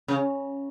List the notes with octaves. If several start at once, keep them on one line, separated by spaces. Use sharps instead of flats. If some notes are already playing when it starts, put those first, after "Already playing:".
C#3